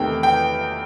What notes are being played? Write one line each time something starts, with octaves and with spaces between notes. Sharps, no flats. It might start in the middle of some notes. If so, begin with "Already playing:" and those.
Already playing: E2 C3 D#3 A3 G5
G5